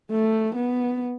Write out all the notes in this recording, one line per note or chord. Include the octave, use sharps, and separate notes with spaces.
A3
B3